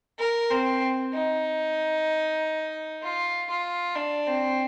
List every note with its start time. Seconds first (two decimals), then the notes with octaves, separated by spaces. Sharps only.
0.19 A#4
0.51 C4
1.13 D#4
3.02 F4
3.50 F4
3.96 D4
4.27 C4